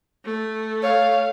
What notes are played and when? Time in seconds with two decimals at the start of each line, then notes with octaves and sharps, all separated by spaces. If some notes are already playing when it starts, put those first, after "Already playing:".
0.24 A3
0.83 C#5 F5